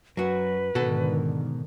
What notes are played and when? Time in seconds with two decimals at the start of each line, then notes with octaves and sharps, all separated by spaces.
0.17 F#2 F#3 F#4 B4
0.75 G#2 B2 D3 D#3 F#4 A4